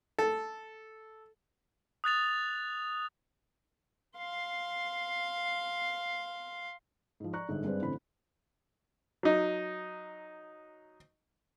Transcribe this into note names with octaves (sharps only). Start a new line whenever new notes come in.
A4
D#6 F#6 A6 F7
F5 C6
G#2 F3
D5 A#5 C#6 F#6
G1 G#2 D3
G2 G3 G#3 C4 B4 D5
A1 D3 C4 B5
F#3 D#4